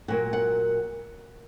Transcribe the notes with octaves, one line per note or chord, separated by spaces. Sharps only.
A#2 F#3 A#3 F#5
F#5